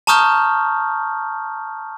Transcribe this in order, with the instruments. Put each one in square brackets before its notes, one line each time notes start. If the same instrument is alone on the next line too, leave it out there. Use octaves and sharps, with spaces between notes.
[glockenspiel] A5 A#5 C#6 D#6 F6 G6